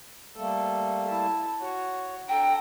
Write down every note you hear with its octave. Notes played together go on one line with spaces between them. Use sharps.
G3 A3 A#3 A4
E4 A5
F#4 C#5
D4 A4 G5 A#5